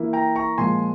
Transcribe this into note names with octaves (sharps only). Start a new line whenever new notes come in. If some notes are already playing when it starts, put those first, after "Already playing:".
Already playing: E3 A#3 E4
G5 A#5
A#5 C#6
A#2 F3 G#3 G#5 C6